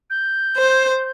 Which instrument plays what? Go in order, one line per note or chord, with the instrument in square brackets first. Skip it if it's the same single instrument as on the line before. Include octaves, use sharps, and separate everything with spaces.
[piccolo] G6
[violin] C5